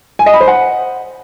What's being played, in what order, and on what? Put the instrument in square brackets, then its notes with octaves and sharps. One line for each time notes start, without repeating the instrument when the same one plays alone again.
[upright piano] G#5
D#5
B5
C5
F#5